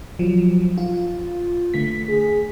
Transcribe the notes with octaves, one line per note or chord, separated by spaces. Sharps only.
F3 F#3
F4
D3 A3 B6
G#4